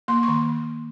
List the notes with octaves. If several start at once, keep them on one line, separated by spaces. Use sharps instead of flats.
A#3 C6
D#3 C#6